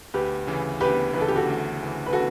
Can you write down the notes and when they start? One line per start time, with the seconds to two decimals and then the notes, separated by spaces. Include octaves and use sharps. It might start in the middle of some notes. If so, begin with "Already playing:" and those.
0.14 D2 G4 B4
0.47 C#3 E3
0.80 D2 G4 B4
1.13 C#3 E3 B4
1.21 A4
1.28 G4
1.36 F#4 A4
1.47 D2
1.79 C#3 E3
2.06 B4
2.13 F#4 A4